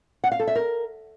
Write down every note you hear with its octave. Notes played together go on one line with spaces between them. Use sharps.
F#5
F5
A4
E5
A#4